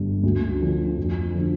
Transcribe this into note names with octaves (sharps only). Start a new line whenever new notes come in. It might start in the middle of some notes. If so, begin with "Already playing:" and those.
Already playing: G1 G2
D2
D3 F3
F2
D3 F3